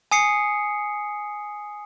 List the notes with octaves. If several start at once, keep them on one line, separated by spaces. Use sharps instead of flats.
G#5 D#6 C7 C#7